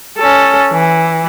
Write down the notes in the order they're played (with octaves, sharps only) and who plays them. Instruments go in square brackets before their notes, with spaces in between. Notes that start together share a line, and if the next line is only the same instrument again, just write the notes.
[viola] C#4 A4
E3